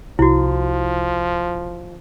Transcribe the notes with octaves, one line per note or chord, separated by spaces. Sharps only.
C2 F3 E4 F#4